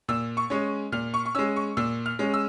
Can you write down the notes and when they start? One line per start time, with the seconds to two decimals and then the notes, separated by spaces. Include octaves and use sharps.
0.08 A#2 E6
0.37 C#6
0.50 G#3 C#4
0.92 A#2 F6
1.14 C#6
1.26 C#6
1.35 G#3 C#4 E6
1.56 C#6
1.77 A#2 E6
2.06 F6
2.19 G#3 C#4
2.34 E6